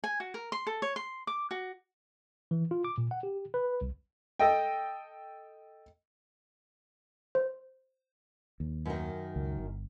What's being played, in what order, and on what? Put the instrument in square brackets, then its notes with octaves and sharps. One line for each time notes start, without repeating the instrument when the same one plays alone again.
[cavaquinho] G#5
F#4
A#4
C6
A4
C#5
C6
D6
F#4
[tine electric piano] E3
F4
D6
A#2
F#5
G4
B4
C2
[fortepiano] A4 D#5 G5
[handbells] C5
[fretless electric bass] D#2
[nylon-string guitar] F#2 D#3
[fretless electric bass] C#2
G1